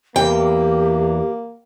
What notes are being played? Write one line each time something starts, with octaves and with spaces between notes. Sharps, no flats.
E2 A#3 G4 G5